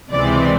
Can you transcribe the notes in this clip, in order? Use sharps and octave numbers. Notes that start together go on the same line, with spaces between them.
C#2 C3 E3 G#3 C4 D5